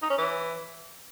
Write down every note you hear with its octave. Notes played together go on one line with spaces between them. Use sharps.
D#4
C#4
E3